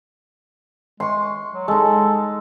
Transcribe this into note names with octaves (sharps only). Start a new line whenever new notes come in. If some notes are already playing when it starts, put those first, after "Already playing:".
G#3 C6 C#6
F#3
G#3 D#4 A4